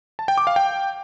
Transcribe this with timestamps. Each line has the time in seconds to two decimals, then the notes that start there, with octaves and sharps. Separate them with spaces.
0.19 A5
0.28 G5
0.38 D6
0.47 F5
0.56 G5